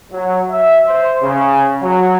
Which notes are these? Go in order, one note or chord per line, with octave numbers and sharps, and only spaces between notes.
F#3
E5
C5
C#3
F#3